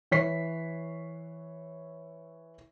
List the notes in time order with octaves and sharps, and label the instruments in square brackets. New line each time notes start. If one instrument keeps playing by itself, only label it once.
[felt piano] E3 C#5 B6 C7